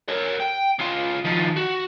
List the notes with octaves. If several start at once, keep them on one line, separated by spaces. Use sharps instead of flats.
A#4 C#5
G5
C#3 F4
D#3 F3
F#4